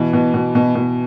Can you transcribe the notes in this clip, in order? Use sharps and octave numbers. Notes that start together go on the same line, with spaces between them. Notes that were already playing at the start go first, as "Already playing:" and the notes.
Already playing: B2 E3
B2
B2
B2
B2